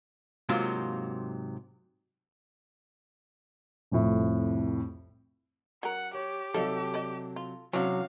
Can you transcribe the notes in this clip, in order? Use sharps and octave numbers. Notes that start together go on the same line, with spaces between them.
G#2 C3 F#3 A#3 C4 F4
C2 F2 A2
F#3 C#4 A#4 F#5
G4 C#5
C3 F#3 G3 D#4 A4 F5
D5 D#5
F4
C3 E3 F#3 C#4 D4 F#4 F5